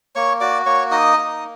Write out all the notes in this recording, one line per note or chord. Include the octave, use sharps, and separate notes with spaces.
A#3 C#5 C#6
F#4 D5 D6
A#3 C#5 C#6
D#4 D#5 D#6
A#3